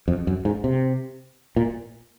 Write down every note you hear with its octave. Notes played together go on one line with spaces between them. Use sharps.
F2
F#2
G#2
C3
A#2